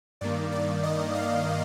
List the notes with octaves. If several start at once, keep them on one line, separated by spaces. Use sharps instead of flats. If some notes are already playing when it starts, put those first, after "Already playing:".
G2 D#3 A#3 D5
D5
D#5
F5